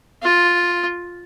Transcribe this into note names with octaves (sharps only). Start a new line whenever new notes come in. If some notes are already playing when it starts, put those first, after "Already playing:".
F4